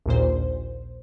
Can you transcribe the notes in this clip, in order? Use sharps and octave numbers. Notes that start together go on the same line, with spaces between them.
A#1 D#2 A#2 C5